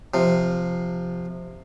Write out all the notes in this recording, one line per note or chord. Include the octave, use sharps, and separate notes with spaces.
C3 F3